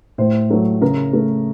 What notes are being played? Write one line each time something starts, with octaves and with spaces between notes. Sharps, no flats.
A2 C5
F#3 A3
C#3 A#4
A3